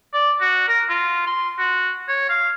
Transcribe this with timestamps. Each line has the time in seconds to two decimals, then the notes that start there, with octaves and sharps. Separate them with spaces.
0.14 D5
0.41 F#4
0.68 A#4
0.89 F4
1.27 C6
1.59 F#4
2.08 C#5
2.30 F5